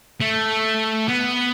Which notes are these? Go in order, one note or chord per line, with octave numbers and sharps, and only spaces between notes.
A3
B3